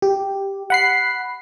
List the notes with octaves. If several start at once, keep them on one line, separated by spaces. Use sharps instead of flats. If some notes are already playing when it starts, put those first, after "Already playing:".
G4
F#5 B5 C7